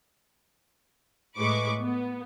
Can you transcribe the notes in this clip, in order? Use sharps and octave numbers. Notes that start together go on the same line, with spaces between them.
A2 G#3 B4 C#6 D6
B3